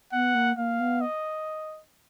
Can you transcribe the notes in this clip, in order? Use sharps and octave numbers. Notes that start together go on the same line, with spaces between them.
B3 F#5
A#3
A#3 F5
B3
D#5